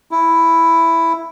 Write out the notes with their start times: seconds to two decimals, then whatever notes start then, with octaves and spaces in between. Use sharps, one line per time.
0.11 E4